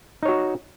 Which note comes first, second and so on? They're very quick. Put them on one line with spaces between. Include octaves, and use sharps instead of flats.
D#4 C#5 F#4